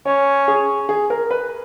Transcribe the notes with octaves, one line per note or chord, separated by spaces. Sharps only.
C#4 C#5
G#4
G#4
A#4
B4